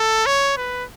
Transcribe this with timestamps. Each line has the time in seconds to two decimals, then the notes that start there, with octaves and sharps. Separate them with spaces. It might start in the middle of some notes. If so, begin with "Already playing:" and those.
Already playing: A4
0.26 C#5
0.57 B4